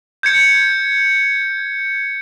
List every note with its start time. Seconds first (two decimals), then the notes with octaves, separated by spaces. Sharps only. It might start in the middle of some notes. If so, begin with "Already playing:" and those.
0.23 G6 G#6 C#7